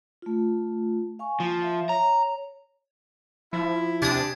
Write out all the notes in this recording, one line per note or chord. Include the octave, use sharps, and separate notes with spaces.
A3 F4
F5 G#5 C#6
F3 A#3
E5 F5
C#5 A#5
F3 E4
C3 D4 G4 G#5 D#6